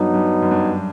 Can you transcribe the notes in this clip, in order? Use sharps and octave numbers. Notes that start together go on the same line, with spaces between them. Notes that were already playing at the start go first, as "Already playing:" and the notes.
Already playing: G2 F#3 B3 D#4
G2
F#2
G2